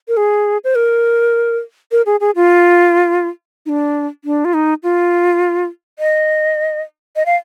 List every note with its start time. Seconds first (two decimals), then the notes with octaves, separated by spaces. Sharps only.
0.08 A#4
0.17 G#4
0.64 C5
0.75 A#4
1.92 A#4
2.06 G#4
2.20 G#4
2.36 F4
3.66 D#4
3.69 D4
4.25 D4
4.45 F4
4.54 D#4
4.83 F4
5.99 D#5
7.16 D#5
7.26 F5